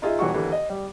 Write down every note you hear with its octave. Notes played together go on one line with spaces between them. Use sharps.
D#4 F4 G#4 D#5 E5
E1 E3 G3 F#4 C#6
D#2 D3 E3
D#5
G3